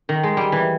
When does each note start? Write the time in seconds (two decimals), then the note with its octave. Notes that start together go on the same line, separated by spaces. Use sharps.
0.09 D#3
0.23 G#3
0.37 G3
0.52 E3